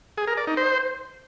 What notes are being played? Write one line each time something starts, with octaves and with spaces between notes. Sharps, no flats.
G#4
A#4
D5
D#4
C5